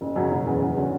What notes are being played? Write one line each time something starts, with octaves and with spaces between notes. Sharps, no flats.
F#1
F#2 C#3 F#3
E1
E2 C#3
E2
D3 F#3 C#4